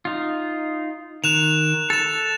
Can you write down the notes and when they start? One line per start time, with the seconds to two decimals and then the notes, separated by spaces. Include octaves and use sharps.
0.05 D#4 F4
1.24 D#3 F#6 E7 F7
1.90 A4 A5 A6 E7